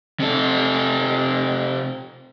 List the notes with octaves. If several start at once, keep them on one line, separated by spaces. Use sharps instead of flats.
C3 A4